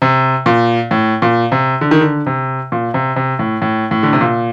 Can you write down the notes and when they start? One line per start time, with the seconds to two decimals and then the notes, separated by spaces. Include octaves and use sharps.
0.02 C3
0.46 A#2
0.91 A2
1.22 A#2
1.52 C3
1.81 D3
1.91 D#3
2.01 D3
2.26 C3
2.72 A#2
2.94 C3
3.16 C3
3.39 A2
3.62 A2
3.91 A2
4.03 D3
4.13 C3
4.21 A#2